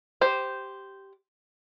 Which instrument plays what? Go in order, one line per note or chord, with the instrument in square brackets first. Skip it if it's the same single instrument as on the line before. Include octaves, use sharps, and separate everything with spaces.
[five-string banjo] G4 C5